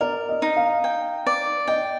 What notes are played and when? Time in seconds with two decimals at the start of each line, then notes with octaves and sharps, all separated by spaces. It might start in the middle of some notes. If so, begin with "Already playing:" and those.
0.01 A#4 D5
0.29 D#5
0.42 D#4
0.56 F5
0.84 G5
1.27 D5
1.68 D#5 G5